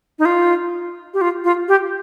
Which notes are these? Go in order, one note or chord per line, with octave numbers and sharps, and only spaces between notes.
D#4
F4
G4
F4
F4
G4